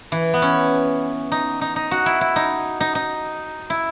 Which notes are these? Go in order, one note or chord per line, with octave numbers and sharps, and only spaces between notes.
E3
B3
C#4
D#4
D#4
D#4
F#4
E4
E4
D#4
D#4
D#4
E4